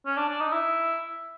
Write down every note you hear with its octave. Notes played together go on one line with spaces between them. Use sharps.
C#4
D4
D4
D#4
E4